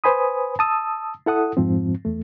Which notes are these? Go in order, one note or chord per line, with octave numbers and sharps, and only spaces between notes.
B4 C5 G#5 B5 D#6
A5 D#6 E6
E4 A4 F#5 D#6
F2 G#2 F3 C4
E2 A3